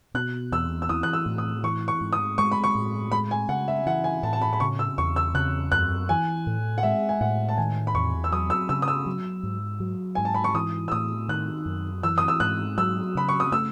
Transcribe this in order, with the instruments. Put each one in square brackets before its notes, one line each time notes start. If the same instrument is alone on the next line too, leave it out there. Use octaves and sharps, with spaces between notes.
[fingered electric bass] B2 [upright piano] F#6
[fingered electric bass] E2 [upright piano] E6
[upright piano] E6
[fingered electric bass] E3 [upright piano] D#6
[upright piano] F#6
E6
[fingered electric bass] A2
[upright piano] D#6
[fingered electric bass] E3 [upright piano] C#6
[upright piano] C#6
[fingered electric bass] G#2
[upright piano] D#6
[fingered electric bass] G#3 [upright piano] C#6
[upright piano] B5
C#6
[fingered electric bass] A2
[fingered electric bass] G#3 [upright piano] B5
[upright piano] G#5
[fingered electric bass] C#3 [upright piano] F#5
[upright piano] E5
[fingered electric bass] E3 [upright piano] F#5
[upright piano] G#5
[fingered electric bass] A2 [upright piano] A5
[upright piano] A5
B5
B5
[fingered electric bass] C#3 [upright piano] C#6
[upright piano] E6
[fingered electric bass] E2 [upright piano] C#6
[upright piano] E6
[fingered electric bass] C#3 [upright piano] F#6
[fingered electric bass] F#2 [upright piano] F#6
[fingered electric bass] E3 [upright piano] G#5
[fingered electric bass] A2
[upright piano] F#5
[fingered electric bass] G#3 [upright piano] E5
[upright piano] G#5
[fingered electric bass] A2 [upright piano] F#5
[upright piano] A5
[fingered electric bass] D#3 [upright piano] G#5
[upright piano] B5
[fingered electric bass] E2 [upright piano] C#6
[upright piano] E6
[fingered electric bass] F#3 [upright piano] D#6
[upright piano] E6
[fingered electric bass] C#3 [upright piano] E6
[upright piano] D#6
E6
[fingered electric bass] F#3
G#2
F#3
[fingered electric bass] G#2 [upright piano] G#5
[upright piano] A5
B5
C#6
[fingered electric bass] E3 [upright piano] D#6
[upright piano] E6
[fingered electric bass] A2 [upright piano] D#6
[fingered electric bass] D#3 [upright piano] F#6
[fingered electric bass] F#2
[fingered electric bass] E3 [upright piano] E6
[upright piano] D#6
E6
[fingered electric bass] G#2 [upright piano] F#6
[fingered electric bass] F#3 [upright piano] E6
[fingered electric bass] C#3 [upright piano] B5
[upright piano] C#6
D#6
[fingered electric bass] A3 [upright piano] E6